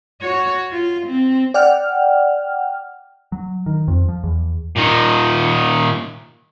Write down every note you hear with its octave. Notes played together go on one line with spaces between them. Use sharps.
F#4 C#5
F4
C4
D5 F#5 G5 F6
F#3
D#3
F2
F3
E2
A#2 D#3